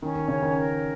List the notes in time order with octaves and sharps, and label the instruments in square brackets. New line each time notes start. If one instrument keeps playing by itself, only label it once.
[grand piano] D#3 [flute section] C#4
[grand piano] D#3
[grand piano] C#3 [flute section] C#5
[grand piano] D#3
[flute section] A#4